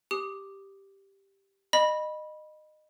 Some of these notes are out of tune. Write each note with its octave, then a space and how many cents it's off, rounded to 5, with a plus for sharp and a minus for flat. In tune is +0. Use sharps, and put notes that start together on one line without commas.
G4 +0 D#6 +0
D#5 -20 B5 -15